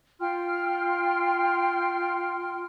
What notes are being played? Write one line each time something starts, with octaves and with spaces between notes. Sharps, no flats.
F4 G5 C6 F6